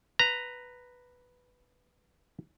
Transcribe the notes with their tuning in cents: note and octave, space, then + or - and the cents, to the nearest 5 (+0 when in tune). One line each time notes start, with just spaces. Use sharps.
B4 +0 A#5 -5